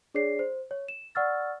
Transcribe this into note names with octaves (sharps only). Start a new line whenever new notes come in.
D4 G#4 C#5 D5 C7
C5
C#5
E7
D5 F#5 C#6 E6 F6 A6